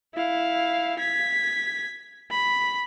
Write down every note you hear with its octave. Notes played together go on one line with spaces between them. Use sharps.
E4 F5
G#6 B6
B5